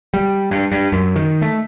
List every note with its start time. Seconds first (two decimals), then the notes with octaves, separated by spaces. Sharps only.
0.14 G3
0.51 G2
0.72 G2
0.92 F#2
1.16 D#3
1.42 A3